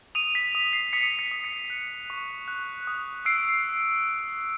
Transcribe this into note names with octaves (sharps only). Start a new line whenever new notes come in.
D#6 D#7 F7
B6
D#6
C7
D#6 B6 C#7
B6 C#7
D#6
B6 C#7
F#6
C#6
F#6
D#6
E6 C7 D7